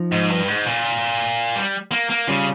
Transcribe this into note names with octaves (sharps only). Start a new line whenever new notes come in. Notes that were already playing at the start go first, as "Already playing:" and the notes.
Already playing: F3 D#4
G#2
G2
G#2
A#2
G3
A#3
A#3
C#3 G3 C#4 F4